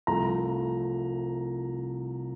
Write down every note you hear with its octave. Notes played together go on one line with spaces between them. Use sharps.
C2 C3 F3 A3 A#5